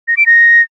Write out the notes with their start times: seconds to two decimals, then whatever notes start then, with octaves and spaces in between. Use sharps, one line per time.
0.08 A#6
0.17 D7
0.26 A#6